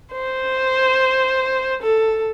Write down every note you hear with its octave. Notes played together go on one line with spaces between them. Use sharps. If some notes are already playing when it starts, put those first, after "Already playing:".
C5
A4